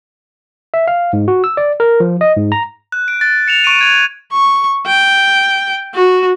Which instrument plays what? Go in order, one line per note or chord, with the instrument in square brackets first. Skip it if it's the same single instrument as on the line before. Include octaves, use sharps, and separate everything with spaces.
[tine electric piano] E5
F5
G#2
F#4
E6
D5
A#4
F3
D#5
G#2
A#5
[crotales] F#6
D7
F#6 A6
C#7 E7 F7
C#6 D7 D#7
G#6 F7
[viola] C#6
G5
F#4